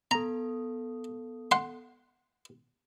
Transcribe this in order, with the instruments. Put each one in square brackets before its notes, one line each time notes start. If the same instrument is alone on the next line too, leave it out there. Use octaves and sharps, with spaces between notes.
[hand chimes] B3 A4 [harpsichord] A#5
[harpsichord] F#5 C6